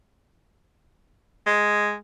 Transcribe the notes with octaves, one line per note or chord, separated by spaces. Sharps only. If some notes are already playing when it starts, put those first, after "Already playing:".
G#3